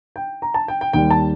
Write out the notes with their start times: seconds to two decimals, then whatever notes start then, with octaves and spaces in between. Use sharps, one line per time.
0.16 G5
0.42 A#5
0.54 A5
0.68 G5
0.81 G5
0.93 D#2 D#3 G3 G5
1.11 A5